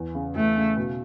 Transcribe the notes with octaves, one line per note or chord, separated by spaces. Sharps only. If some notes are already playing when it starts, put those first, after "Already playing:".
Already playing: E2
C#3
E2 A3
C#3
B2